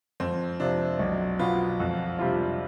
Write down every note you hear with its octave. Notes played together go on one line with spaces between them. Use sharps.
F2 C4
C3 F3 D4
B1
B2 B3 F4
F2
C3 G3 D4 F4